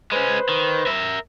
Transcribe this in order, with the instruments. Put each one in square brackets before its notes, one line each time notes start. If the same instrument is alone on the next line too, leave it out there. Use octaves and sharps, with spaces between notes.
[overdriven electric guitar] G#3 C#4 [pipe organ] B4 C5
[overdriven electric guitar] D#3
A#4 E5